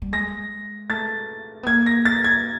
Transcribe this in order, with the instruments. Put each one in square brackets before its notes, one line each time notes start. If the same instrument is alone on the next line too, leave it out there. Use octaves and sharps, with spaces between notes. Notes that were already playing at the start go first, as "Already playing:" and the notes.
[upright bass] G3
[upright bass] G#3 [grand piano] A#6
[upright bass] A3 [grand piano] A6
[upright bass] B3
[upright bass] A#3 [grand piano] G#6
[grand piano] A#6
A6
G#6